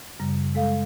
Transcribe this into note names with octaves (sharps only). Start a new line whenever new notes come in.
F#2 C#3 G3
G#3 A4 F5